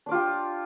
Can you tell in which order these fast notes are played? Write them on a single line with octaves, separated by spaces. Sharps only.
D4 D5 F4 G4